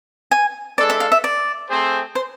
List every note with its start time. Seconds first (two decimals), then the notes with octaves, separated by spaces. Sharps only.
0.31 G#5
0.78 G#3 D4 A4 D5
0.90 E5
1.00 F5
1.12 E5
1.24 D5
1.69 A3 C4 G#4 C5
2.15 C5